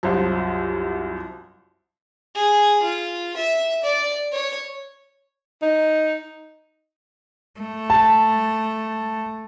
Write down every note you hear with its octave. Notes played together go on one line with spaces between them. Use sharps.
C2 F#2 F3
G#4
F4
E5
D5
C#5
D#4
A3
A5